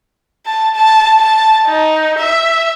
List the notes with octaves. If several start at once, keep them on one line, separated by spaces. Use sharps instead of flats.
A5
A5
A5
D#4
E5